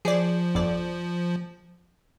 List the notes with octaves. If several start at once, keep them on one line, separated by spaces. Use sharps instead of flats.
F3 G#4 D5
G1 F2 D5